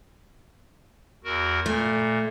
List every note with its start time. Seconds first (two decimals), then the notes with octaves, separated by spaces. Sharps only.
1.24 E2 F#4 A#4
1.66 A#2 A3